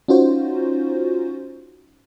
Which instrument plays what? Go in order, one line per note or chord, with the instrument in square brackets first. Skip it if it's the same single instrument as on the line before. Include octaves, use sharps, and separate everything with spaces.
[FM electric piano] C#4 D#4 F4 F#4 C5